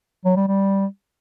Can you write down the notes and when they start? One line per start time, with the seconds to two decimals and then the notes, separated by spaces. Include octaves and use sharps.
0.25 F#3
0.36 G3
0.47 G3